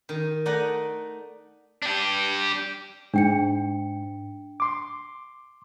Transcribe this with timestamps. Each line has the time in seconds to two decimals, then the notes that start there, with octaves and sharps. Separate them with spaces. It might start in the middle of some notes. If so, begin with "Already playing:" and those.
0.09 D#3
0.46 A3 D#4 D5 D#5 F#5
1.83 D4 G4
3.14 G#2 D4 G5 C#7
4.60 C6 D6